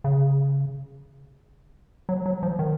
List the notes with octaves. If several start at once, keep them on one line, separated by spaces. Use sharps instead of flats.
C#3
F#3
F#3
F3
D#3